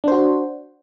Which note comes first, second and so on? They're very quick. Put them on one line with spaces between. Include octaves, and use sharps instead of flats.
D4 C5 F#4